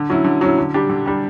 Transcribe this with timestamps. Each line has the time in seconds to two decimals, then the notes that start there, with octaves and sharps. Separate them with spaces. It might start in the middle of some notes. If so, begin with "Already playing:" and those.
Already playing: D3
0.10 F#3 C#4 E4
0.25 D3
0.41 F#3 C#4 E4
0.58 D3
0.74 G3 D4 G4
0.90 D3
1.06 G3 D4 G4